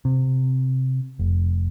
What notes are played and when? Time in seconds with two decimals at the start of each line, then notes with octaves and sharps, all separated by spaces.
0.05 C3
1.19 F1